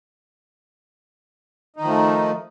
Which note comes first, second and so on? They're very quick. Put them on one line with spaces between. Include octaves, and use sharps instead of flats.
D#4 D#3 F3 A3